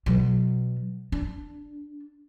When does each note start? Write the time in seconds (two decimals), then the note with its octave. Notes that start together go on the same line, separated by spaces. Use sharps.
0.06 B2 F#3
1.12 D4